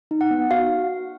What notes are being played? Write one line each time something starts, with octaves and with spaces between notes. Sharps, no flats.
D#4
F#5
B3
F#4 F5